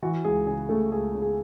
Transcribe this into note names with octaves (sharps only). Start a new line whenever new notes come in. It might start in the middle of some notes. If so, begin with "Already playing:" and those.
E3 F#4
C#2 G#4
C#3 G#4
C#3 A3 A4
C#2 G#4
C#3
G#4